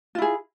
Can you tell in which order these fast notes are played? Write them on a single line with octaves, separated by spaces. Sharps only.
F4 E4 G#4